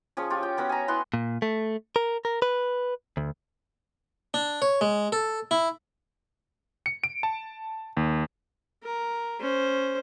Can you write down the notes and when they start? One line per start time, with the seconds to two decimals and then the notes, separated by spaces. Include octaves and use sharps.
0.17 F3 C#4 G#4 C#5
0.30 F4 G4
0.43 G5
0.57 B3 C#4 F#4 B5
0.69 G#5 A#5
0.88 B3 E4 F#5 C6
1.14 A#2
1.42 A3
1.96 A#4
2.25 A#4
2.42 B4
3.17 D2
4.34 D4
4.62 C#5
4.81 G#3
5.12 A4
5.51 E4
6.86 C#7
7.04 D7
7.23 A5
7.97 D#2
8.84 A#4
9.40 C#4 C5